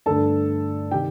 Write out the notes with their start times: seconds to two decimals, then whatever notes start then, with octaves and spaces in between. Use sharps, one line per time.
0.06 G2 D3 A3 A4 A5
0.91 C3 D#3 G4 G5